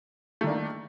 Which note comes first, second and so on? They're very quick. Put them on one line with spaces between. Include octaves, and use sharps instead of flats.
A3 D#3 D4 A#3